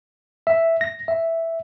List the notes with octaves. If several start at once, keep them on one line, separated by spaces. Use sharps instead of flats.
E5
A#6
E5